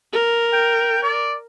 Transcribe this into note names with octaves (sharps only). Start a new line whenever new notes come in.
A#4
G5
D5